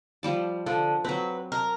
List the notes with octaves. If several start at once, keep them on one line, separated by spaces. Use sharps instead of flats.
F3 G3 A5
D3 F3
F#3 C4 B4
A#4